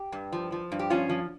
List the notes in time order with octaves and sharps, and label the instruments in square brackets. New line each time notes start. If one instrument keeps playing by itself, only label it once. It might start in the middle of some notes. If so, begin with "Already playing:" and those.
Already playing: [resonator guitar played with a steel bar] G4
G2
F3
F3
G2
G4
F3 C#4 F4
F3